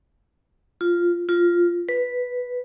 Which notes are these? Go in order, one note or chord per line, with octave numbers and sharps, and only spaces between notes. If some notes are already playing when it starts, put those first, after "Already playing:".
F4
F4
B4